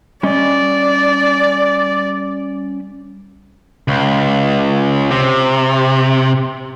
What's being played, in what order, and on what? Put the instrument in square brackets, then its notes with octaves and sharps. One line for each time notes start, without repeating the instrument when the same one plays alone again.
[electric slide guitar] G3 C#4 D#5 [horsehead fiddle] D5
[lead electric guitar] C#2
C3